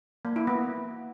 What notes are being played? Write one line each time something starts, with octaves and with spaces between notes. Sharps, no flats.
A#3
E4
B3